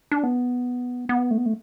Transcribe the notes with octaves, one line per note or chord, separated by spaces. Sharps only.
D4
B3
B3
A3
B3
A3